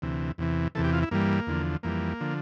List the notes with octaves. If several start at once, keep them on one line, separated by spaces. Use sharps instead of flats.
D2 C3 E3
E2 C3 E3
E2 C3 E3 A4
G4
F4
E4
G2 E3 G3 A#3
E2 D3 F3
F2 E3 G3 A#3
D3 F3